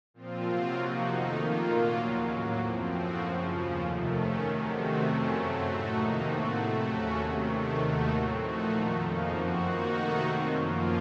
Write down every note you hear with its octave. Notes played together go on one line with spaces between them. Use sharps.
A#2 F3 C4 F4
C3 F#3 C4 F4
C3 F3 A#3 D#4 F#4
F2 D#3 A3 D#4
F2 D#3 A#3 F4
A#2 F#3 A#3 F4
D#2 C#3 F#3
A2 F#3 A#3
F#2 F3 C4
A2 F3 C4 F#4
F#2 C#3 F3
D#2 C#3 F3
F2 C3 D#3 A3
D#3 A3 C#4
C3 D#3 F#3
C3 D#3 A3 C4 F#4
F2 C3 F#3 A3 C#4
F#2 C#3 F#3 A3 C4
A2 A3 D#4 F#4
F2 C3 D#3 A#3 D#4
A2 A3 C4 F#4
C3 F#3 A3
D#2 C#3 A3 C#4 F#4
C3 D#3 F#3
C3 D#3 A3
D#2 D#3 A3 D#4 F#4
A2 F#3 C4
A#2 F3 A3 D#4 F#4
F2 D#3 A3
F2 C#3 F3 A#3 D#4
F#2 F3 C4 F#4
D#3 A#3 D#4 F#4
C3 D#3 A3 D#4 F#4
D#3 F#3 C4
F#2 F3 A#3 F4